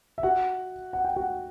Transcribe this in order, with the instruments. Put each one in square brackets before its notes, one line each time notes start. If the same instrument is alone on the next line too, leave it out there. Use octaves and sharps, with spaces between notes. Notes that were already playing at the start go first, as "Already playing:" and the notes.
[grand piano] E5
F#4 F#5
F#5
G5
F#4 F#5